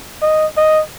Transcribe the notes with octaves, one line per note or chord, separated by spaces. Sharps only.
D#5
D#5